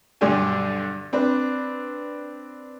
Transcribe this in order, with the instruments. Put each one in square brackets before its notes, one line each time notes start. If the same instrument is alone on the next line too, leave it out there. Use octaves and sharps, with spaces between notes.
[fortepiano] B1 G2 D3 D4 G4 G#5
C4 D4 B4